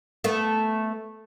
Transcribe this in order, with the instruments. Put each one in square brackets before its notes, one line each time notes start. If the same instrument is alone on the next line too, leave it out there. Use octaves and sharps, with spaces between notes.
[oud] A3 B3